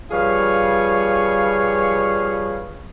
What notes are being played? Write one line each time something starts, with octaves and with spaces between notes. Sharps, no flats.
F3 G3 G#4 B4 C#5 F5